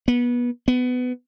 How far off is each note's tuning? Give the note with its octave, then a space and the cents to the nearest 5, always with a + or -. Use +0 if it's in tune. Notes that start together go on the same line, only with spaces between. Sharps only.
B3 -25
B3 +20